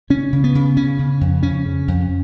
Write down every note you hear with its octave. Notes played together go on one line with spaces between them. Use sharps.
C#3 C#4
C#3
B3
C#3
C#3 C#4
C#3
F2
C#3 C#4
C#3
F2